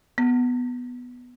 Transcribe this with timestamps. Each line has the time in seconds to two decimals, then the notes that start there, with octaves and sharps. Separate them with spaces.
0.18 B3